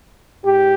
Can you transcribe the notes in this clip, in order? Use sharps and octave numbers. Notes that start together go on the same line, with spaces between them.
G#2 G4